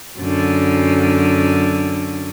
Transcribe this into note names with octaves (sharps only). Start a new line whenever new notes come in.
F#2 D3